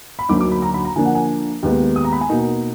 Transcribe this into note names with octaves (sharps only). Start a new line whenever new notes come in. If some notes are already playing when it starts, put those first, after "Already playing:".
B5
D2 D3 F#3 A#3 D#4 D6
D6
B5
A#5
B5
A#5
D3 F3 A#3 D4 G#5
F#5
G#5
D#2 D#3 G#3 B3 D#4
D#6
A#5
B5
G#5
B2 A#3 D#4